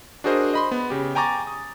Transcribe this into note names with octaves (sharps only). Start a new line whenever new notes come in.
D4 F#4 G#4 A#4 C5 D#5
D#5 B5 C6
B3
C#3 G4
G5 G#5 A#5 C#6 D6 A6
D#6